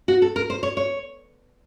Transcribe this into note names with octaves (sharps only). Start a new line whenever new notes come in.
F#4
A4
A#4
C5
C#5
C#5